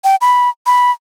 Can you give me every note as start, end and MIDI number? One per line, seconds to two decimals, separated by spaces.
0.04 0.16 79
0.21 0.49 83
0.66 0.91 83